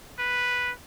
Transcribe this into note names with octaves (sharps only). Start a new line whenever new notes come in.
B4